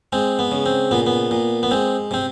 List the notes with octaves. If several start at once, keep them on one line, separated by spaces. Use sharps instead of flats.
G#3 C4
B3
C#3
C4
A#2 B3
B3
A#2
B3
G#3 C4
C3 C4